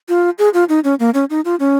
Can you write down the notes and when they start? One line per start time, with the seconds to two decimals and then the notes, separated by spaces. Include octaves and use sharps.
0.09 F4
0.39 G#4
0.54 F4
0.69 D#4
0.84 C#4
1.00 A#3
1.14 C#4
1.30 D#4
1.45 F4
1.60 C#4